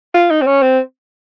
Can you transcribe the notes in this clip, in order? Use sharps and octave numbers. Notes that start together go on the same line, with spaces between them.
F4
D#4
C4
C#4
C4